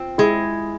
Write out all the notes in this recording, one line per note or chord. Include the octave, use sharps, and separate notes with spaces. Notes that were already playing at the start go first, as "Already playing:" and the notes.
Already playing: C4 F4
G#3 E4 G#4